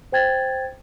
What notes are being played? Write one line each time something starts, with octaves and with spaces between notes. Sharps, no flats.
C5 G5 G#6 A6